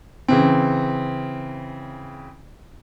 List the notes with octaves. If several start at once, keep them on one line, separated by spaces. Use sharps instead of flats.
C#3 E3 C4